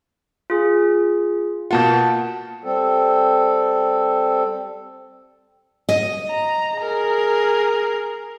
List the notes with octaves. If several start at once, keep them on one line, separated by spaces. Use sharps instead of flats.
F4 G#4
B2 A#3 F4 F#5 A5 G6
G3 C4 A4
D#5
A#5
G#4 A#4